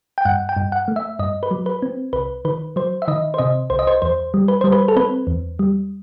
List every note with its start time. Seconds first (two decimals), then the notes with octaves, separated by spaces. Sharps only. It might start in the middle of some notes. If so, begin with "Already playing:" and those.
0.18 G5
0.25 G2 F#5
0.49 G5
0.56 G2
0.72 F#5
0.88 A3
0.96 E5
1.19 G2 D#5
1.43 B4
1.51 F#3
1.66 B4
1.82 C4
2.13 C2 B4
2.45 D#3 B4
2.76 F#3 C5
3.02 E5
3.08 D#3 D#5
3.34 C5
3.38 C3 D#5
3.70 C2 C5
3.79 D#5
3.87 C5
4.02 E2 C5
4.34 G3
4.48 B4
4.61 G3 C5
4.72 B4
4.88 A4
4.96 C4 B4
5.27 E2
5.59 G3